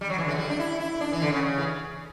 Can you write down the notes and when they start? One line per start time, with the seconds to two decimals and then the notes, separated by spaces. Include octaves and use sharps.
0.01 G3
0.10 F#3
0.18 E3
0.24 D3
0.28 E3
0.35 A3
0.38 G3
0.49 D4
0.59 E4
0.80 E4
1.01 D4
1.12 E3
1.22 D3
1.32 C#3
1.43 C#3
1.58 E3